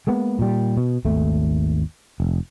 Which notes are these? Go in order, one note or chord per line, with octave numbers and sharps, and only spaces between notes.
G#3 A#3 B3
A#2 G3
B2
G#1 D#2 A3
F1